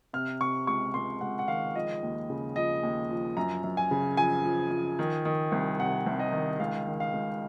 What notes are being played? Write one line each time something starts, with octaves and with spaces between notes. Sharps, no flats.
C3 F6
C3 C#6
C#2 C#6
C#2 C6
C#2 F#5
F#5
D#3 F5
F3 D#5
D#2
C#3
F3 D#5
D#2
F3
F#2 A#5
F#2
G#5
C#3
F3 G#5
F3
F3
D#3
D#3
C2
C3 F#5
C2
D#5
D#3
C#2 F5
D#3
F5
C#2